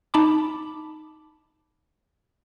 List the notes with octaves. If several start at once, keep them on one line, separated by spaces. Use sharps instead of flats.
D#4 A5 B5 D6